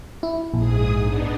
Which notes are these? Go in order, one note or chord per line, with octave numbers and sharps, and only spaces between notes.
E4
A#1 G#2 G#4 D#6
B3 D4 D#4